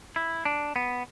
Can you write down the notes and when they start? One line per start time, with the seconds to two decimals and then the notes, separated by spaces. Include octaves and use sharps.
0.16 E4
0.45 D4
0.76 B3